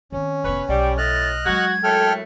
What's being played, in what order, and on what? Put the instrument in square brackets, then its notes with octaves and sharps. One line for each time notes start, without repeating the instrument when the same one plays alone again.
[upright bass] D#3 C4 [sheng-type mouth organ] C#4
[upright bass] F1 B3 [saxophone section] B4 C#5
[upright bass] B1 [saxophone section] G3 [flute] G5
[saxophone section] A2 [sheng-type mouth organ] D#5 F6 F#6 [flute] A6
[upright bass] F#3 G#3 [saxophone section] F#4 [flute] G#6
[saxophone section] F#2 A2 A3 [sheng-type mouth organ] A4 G5 F6